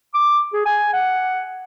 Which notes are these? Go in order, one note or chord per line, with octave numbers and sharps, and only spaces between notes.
D6
G#4
G#5
F#5